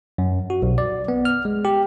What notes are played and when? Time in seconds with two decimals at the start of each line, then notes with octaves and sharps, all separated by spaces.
0.18 F#2
0.50 F#4
0.62 B1
0.78 D5
1.08 B3
1.25 F6
1.45 G#3
1.65 G4